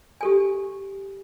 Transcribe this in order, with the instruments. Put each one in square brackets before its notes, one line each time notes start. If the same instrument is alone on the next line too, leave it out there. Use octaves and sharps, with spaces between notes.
[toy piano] G4 A4 G#5